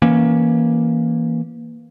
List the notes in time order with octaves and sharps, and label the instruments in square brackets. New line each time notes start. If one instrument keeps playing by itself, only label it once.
[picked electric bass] E3 A#3 C#4